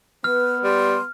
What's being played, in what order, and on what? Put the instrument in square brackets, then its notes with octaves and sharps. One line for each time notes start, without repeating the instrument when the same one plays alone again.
[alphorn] B3 [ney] B4 [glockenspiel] F6
[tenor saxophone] G3 [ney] C6